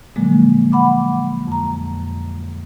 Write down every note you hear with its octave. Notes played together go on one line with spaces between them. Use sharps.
A#2 D3 F3 F#3 G#3 A#3
F#5 B5 D6
F2 A#5